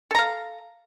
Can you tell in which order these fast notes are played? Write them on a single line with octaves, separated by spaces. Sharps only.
A4 A#5 F5